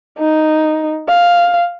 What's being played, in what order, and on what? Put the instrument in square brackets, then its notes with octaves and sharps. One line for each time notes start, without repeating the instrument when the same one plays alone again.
[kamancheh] D#4
F5